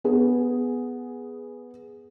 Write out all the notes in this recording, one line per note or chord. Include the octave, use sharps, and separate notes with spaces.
B3 G#4